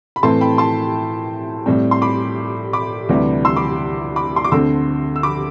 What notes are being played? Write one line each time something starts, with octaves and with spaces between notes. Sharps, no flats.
B5
A2 E3 A3 C4 A5 C6
G5 B5
A5 C6
A2 G3 C4
C6
B5 D6
B5 D6
D2 C3 E3 G3
C6 E6
B5 D6
B5 D6
C6
D6
D2 D3 A3 C4 C6 E6
E6
B5 D6